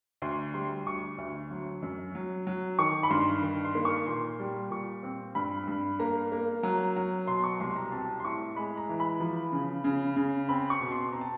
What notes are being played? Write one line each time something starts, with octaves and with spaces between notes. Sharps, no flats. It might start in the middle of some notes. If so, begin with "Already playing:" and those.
D2 C6
G3 C6
D2 C#6
D2
F#3
F#2
F#3
F#3
D#3 C#6
B5
G2 C6
D#3
C6
A#3
C#6
A#2 C6
G3
A#2 C#6
C4
G2 B5
G2
A#3 A#5
A#3
F#3 A#5
F#3
B2 C6
C#6
C2 C6
A#5
C4 A5
C6
A2 C#6
G#3 B5
A#5
E3
B5
F3
C#3
C#3
C#3
C4 B5
C#6
B2
C6
C4 A#5
A5